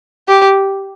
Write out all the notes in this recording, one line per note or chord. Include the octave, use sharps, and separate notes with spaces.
G4